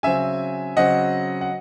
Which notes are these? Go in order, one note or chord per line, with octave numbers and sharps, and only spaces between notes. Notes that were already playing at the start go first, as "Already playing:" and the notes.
C#3 F#3 C4 E5 G#5
C#3 F#3 C4 D#5 F#5
F#5